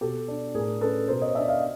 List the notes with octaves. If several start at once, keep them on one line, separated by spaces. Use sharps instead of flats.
B2 G4 A4
D4
A2 G#4 A#4
C#4 A4 B4
B2 A#4 C5
C#5 D#5
D4 D5 E5
D#5 F5